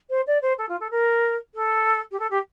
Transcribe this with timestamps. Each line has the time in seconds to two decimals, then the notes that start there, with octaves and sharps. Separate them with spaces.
0.10 C5
0.27 D5
0.42 C5
0.58 A4
0.69 F4
0.80 A4
0.90 A#4
1.55 A4
2.11 G4
2.19 A4
2.30 G4